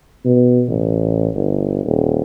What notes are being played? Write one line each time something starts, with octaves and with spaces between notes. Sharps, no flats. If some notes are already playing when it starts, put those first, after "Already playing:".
B2
A1
G1
D#1